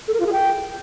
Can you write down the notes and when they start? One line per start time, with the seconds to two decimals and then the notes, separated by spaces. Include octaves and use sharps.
0.08 A4
0.14 A#4
0.20 F4
0.26 G#4
0.33 G5